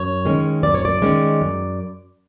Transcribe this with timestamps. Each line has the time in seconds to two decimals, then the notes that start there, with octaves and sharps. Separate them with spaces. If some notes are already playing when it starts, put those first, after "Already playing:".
Already playing: F#2 C#5
0.25 D#3 G#3 C#4
0.63 F#2 D5
0.75 C#5
0.85 D5
1.02 D#3 G#3 C#4
1.41 F#2